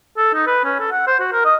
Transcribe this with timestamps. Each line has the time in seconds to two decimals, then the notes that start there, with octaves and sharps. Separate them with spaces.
0.18 A4
0.34 D#4
0.47 B4
0.65 C#4
0.80 A4
0.92 F#5
1.07 C5
1.20 F#4
1.32 A#4
1.45 D#5